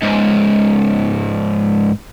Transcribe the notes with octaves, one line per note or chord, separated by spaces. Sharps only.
C#2 G#2